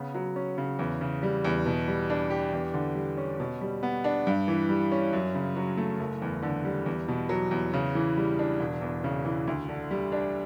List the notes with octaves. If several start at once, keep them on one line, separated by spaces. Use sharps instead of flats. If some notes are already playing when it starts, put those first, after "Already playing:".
Already playing: C#3 B3
F#3
C#4
C#3
E2
C#3
G3
E2
B2
G3
D4
G4
E2
D3
G3
C#4
B2
G3
B3
D4
G2
E3
G3
C#4
F#2
C#3
F#3
A3
F#1
E2
D3
G3
E2
B2
F#3
E2
C#3
E3
G3
D4
E1
E2
C#3
E3
D2
D3
G3
D4